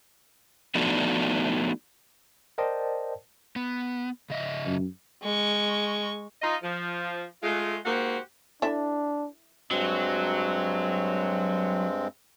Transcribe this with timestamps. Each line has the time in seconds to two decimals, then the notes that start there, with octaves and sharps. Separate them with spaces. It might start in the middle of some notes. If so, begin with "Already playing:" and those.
0.75 F3 A3 B3 D4 D#4 F#4
2.58 A#4 C5 D5 D#5 G5 A5
3.56 B3
4.30 C#3 D#5 E5
4.66 F#2
5.22 G#3 C#6
6.42 D#4 F4 D#5
6.63 F3
7.43 G#3 A3 F4
7.85 G#2 A#3 F#4 G4 C5 F#5
8.62 D4 E4 A4 E5
9.71 G2 F#3 G#3 C4